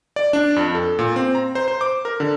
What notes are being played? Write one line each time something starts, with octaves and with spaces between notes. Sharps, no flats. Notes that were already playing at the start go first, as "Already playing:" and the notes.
D5
D4
F2
A4
A#2
C4
A#5
C5
C5
D6
A#4
D3